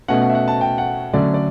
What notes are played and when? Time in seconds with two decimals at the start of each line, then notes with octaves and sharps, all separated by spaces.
0.08 B2 A3 C#4 F#5
0.22 F#5
0.30 E5
0.35 F#5
0.48 A5
0.61 G5
0.78 F#5
1.13 D3 F#3 A3 C#4 D5
1.34 D5